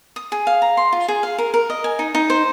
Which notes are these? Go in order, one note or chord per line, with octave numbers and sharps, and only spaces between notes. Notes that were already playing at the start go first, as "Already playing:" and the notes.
D#6
G#4
F5
A#5
C6
F4
G#4
F5
A#4
A#4
D#5
G#5
D#4
D#4
C5